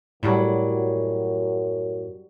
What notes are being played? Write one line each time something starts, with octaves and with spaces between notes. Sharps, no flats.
F#2 A2 F#3 G3 E4